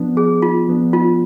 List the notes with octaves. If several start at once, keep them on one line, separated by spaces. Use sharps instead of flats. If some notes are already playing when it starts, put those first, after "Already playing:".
Already playing: F3 B3 D4
G#4
F4
F3 B3 D4
F4